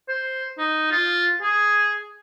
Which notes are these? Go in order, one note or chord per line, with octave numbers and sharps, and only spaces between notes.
C5
D#4
F4
G#4